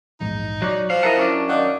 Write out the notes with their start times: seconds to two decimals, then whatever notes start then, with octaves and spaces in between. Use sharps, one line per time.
0.20 A#1 E2 G#2 D#4
0.62 F#3 D5 C#6 F#6
0.90 F3 F5
1.03 E4 A#4 D#5 E5 F#5 A5
1.17 F#2 C#4 D4
1.49 D#3 D5 F5 F#5